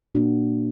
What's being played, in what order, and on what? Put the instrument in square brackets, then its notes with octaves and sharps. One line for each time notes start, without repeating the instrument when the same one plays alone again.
[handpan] A#2 A#3 D4 F#4